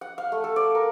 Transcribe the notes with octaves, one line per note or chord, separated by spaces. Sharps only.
F#5
F5
A3
A4
D5
A#4